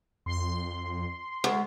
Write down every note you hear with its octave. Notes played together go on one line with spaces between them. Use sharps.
F2 C6
D2 G#3